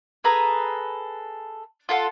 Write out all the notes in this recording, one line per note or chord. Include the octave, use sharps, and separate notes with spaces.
G#4 A4 B4 A#5
F4 A4 F#5